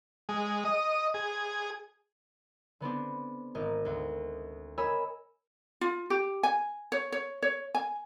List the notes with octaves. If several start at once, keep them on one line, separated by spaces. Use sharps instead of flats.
G#3
D#5
G#4
D3 B3 C4 D4
G#1 A#4 D#5
D2 D3
A#4 C#5 D#5 G#5 B5 E6
F4
G4
G#5
C#5
C#5
C#5
G#5